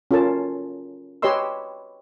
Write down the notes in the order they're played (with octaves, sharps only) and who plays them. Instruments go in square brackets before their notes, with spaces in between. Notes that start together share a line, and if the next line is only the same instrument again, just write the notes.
[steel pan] C#4 F4 A4 A#4 A5
G4 B4 C#5 D#5 C6 E6